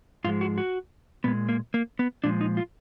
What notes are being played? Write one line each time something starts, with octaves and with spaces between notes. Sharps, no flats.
G#2 F3 G#3 F4
F#4
F#4
A#2 G#3 B3
A#3
A#3
B3
A#2 F3 G#3 D4
D#4
F4